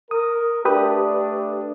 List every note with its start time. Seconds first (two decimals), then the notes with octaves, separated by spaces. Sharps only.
0.11 A#4 D#6
0.65 A3 D4 G4 B4 D#6